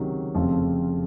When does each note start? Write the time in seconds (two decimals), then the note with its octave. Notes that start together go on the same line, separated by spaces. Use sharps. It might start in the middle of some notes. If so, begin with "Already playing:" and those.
Already playing: C#2 C3 D#3 F#3
0.34 F1 F2 C#3 F3 C4